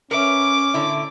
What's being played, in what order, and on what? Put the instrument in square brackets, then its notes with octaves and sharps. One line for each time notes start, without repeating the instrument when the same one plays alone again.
[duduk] C#4 [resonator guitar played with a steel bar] A#4 B4 E5 [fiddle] D6
[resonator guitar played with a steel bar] A2 D3 E4